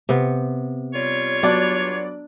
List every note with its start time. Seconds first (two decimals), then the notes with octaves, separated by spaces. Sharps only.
0.09 C3 B3
0.94 G3 F4 C#5
1.43 F#3 B3 D4 D5